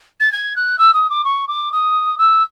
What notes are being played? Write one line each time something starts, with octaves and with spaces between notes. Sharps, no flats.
A6
G#6
F#6
E6
D#6
D6
C#6
D6
D#6
E6